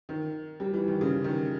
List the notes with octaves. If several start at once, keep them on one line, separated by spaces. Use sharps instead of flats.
D#3
G3
E3
D#3
C#3
D#3